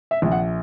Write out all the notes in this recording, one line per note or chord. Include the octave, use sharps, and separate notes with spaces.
E5
A#1
F#5